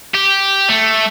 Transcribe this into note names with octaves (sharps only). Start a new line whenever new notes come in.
G4
A3